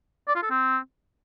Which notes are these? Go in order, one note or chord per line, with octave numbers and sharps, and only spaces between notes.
D5
F4
A4
C4